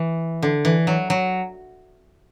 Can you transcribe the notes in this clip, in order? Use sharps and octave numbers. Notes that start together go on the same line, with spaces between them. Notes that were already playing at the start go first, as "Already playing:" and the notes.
Already playing: E3
D3
E3
F#3
F#3